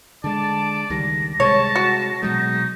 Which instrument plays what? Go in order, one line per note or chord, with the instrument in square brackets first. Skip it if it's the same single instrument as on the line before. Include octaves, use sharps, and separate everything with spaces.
[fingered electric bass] D3 G#3 [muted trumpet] D5 [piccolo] A5
[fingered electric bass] C#2 D#3 G3 [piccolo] A#6
[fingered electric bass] C3 G3 G#3 [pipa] C#5 [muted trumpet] A5
[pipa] F#4
[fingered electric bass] B2 F#3 G#3 [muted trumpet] D#4